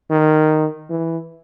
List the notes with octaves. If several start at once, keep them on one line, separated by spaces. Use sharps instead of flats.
D#3
E3